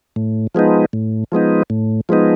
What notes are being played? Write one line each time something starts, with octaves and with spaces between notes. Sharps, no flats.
A2
F3 G#3 B3 D#4
A2
F3 G#3 B3 D#4
A2
F3 G#3 B3 D#4